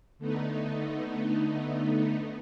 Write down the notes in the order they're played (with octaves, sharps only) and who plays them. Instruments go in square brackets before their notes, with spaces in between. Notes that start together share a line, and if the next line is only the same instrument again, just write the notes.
[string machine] D3 A3 B3 D#4